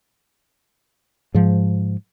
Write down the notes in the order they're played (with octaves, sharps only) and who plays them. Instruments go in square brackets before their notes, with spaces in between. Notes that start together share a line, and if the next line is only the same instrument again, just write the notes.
[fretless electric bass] G#2 F3